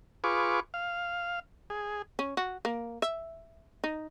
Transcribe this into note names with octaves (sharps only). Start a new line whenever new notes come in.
F4 G#4 B4 C#6 D6
F5
G#4
C#4
F#4
A#3
E5
D#4